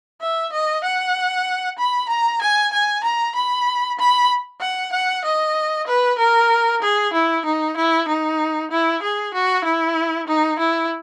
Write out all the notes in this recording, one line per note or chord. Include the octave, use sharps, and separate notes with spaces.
E5
D#5
F#5
B5
A#5
G#5
G#5
A#5
B5
B5
F#5
F#5
D#5
B4
A#4
G#4
E4
D#4
E4
D#4
E4
G#4
F#4
E4
D#4
E4